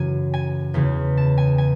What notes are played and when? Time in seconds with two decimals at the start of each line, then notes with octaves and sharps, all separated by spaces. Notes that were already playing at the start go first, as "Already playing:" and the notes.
Already playing: F#2 C#3 E3 G#5
0.34 G#5
0.74 E2 C#3 E3 B3
1.17 A5
1.38 G#5
1.58 G#5